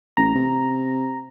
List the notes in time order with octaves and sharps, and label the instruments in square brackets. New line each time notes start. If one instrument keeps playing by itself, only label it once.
[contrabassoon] A1 [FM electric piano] A#5
[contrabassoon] C3